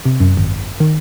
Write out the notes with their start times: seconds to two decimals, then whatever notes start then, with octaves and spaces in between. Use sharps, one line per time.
0.05 C3
0.20 F#2
0.37 G#1
0.80 D#3